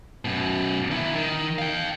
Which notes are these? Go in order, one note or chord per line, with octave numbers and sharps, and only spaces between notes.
F#2 B2
D#3 E4
D#3
F5 G5